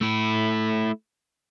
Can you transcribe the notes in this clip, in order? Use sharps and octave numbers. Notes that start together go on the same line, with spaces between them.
A3 E4